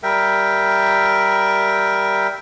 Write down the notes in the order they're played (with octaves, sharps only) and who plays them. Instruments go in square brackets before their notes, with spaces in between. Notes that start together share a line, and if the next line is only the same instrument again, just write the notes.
[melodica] G3 A#4 E5 G5